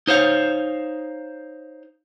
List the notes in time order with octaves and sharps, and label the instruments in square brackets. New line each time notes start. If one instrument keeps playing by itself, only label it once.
[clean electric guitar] D#4 C5 C#5 F5